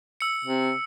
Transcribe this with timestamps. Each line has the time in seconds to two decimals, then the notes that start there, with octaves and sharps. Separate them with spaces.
0.20 E6 C#7
0.45 C3